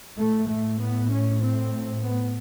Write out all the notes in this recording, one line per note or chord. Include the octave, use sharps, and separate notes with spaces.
A2 A3
A3
B3
C#4
C4
B3